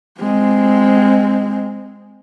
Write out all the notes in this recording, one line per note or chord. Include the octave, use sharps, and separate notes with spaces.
G#3 C4